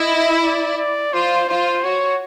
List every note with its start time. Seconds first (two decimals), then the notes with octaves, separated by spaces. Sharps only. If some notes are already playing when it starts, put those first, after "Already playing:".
Already playing: E4 D#5
0.43 D5
0.79 D5
1.13 F4 C5
1.49 F4 C5
1.84 F#4 C#5